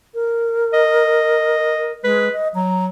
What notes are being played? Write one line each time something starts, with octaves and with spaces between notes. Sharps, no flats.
A#4
D#5
G#3 B4
D#5
F#3 A#5